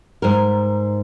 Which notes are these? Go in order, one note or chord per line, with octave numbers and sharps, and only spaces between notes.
G#2 A#4